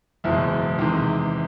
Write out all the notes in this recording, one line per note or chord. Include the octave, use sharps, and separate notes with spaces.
F#1 E2 B2 G#3 E4
E2 C3 D#3 G#3